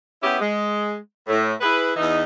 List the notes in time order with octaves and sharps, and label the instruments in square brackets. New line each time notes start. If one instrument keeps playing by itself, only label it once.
[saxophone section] B3 C#4 E4 G4
G#3
A2
E4 G#4 B4
E2 E3 D#4